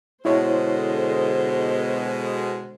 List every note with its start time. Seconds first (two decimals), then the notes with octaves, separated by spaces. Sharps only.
0.25 B2 D3 G#3 E4 A4 C5 C#5